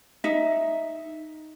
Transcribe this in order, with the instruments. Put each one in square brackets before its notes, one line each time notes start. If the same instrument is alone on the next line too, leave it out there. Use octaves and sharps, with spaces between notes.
[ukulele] D#4 E5